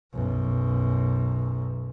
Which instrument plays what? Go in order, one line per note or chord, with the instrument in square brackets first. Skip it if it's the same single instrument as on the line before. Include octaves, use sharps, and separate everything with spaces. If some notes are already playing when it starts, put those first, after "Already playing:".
[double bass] B1 F#2